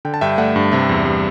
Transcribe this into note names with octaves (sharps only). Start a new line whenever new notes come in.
D3 G5
A5
G2 E5 G5
A3 D5 F#5
G2
C3 E5
E2
G3